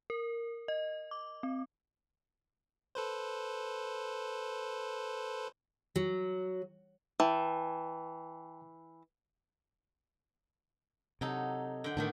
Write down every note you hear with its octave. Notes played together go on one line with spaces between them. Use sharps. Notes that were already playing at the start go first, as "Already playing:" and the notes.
A#4
D#5
D6
C4
A4 B4 C5
F#3
E3 G5 A5
C3 F#3 D#4 A4
D3 G5
A2 D3 D#3 B3 D4